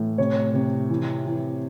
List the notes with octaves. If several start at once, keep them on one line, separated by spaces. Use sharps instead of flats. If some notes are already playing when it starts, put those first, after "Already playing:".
Already playing: A2 E3
C3 C#5
C3
E3
E3